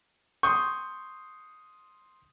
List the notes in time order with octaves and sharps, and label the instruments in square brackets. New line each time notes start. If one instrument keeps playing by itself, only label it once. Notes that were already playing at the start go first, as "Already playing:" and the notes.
[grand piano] C6 D#6 G6 [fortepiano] C#6